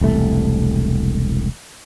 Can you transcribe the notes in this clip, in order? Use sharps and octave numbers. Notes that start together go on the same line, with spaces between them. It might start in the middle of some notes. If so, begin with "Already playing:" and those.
E1 C2 A3